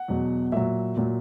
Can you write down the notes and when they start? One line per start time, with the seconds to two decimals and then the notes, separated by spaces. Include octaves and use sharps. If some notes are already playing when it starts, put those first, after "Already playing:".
Already playing: F#5
0.08 E2 B2 F#3
0.52 A#2 F#3 E5
0.97 A#2 F#3